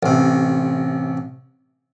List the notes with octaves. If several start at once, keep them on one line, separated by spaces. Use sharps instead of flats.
A1 C3